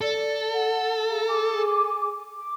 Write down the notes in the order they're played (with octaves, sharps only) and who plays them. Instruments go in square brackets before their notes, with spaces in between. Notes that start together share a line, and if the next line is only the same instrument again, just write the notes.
[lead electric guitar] A4 [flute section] D5
[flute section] F#5
G#4 F5 A#5
G#4 G#5 D6
D6